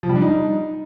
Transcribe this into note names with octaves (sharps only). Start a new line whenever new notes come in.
F3
G3
D4
D#4